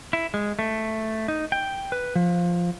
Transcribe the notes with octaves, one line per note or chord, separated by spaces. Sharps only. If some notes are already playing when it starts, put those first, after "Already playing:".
E4
G#3
A3
D#4
G5
B4
F3